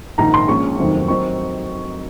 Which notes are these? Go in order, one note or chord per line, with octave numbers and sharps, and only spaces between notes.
A#1 G#2 D#3 A#5
C6
A#1 A#2 G#3 C#4 C#6
F1 D#2 D#3 F#3 C4
D#3 F#3 C4 D#4 C#6